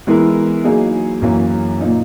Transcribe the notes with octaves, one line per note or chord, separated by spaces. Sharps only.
E3 G#3 B3 E4 A#4
F#3 A#3 D#4 G#4
F#2 E3 A#3 C#4
A#2 A#3 D#4